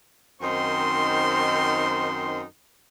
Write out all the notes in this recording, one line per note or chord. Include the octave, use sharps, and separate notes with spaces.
F#2 D#3 C4 D#4 C5 C6